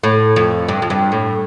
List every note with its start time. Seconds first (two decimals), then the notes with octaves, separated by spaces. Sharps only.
0.03 A2
0.36 F2
0.68 G2
0.82 F2
0.90 G2
1.12 A2